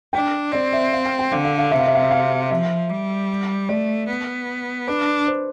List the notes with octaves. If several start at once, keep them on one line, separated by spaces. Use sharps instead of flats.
D4 G5
C4 D5
E5
F5
G5
G5
D3 F5
F5
F5
C3 E5
F5
E5
F5
E5
F5
F3 E5
G3
A3 D5
B3
D4 B4
C5